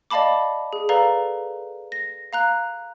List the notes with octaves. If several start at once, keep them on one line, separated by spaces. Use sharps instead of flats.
D5 D#5 F5 A5 B5 D6
G#4
A4 B4 D5 F5 A#5
A#6
F5 A#5 F#6